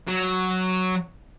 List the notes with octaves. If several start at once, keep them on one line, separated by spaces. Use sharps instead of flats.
F#3